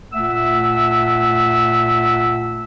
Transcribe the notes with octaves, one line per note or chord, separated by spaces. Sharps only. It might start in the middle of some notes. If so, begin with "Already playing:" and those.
A#2 A3 E5 F#5 E6